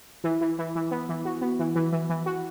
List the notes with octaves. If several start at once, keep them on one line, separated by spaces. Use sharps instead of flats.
E3
E3
E3
E3
B3
E3
F#4
B3
E3
E3
E3
E3
F#4